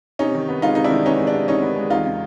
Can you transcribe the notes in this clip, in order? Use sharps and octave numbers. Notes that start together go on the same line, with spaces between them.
C3 C#4 D#4
D#3
B3
G#3 D#4 F4
C3 D#4
D4 E4
D#3
B3 C#4 D#4
G#3
D4
C3
D#3 C#4 D#4
B3
G#3
E2 D#4 F4
C#3